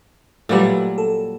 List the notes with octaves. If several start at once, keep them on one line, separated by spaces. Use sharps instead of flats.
A#2 F#3 G3 A3 B4
A4